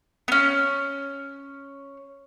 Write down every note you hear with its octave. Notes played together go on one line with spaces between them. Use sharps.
B3 C#4